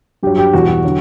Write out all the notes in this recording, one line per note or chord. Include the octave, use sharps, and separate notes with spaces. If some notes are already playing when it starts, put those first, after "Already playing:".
G2 F#3 G4
G4
E2 B2 G3 F#4
F#4
D3 F#3